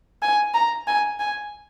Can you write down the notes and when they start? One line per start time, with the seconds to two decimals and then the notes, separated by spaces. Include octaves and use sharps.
0.22 G#5
0.54 A#5
0.87 G#5
1.20 G#5